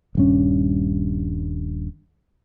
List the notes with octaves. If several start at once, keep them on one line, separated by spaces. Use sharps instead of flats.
D#1 G2 C#4